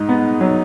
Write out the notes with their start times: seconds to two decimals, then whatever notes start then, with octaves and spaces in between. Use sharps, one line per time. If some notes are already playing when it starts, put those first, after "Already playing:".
Already playing: G#2 D#4
0.09 B3
0.41 F#3